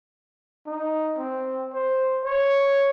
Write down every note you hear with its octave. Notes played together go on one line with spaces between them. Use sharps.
D#4
C4
C5
C#5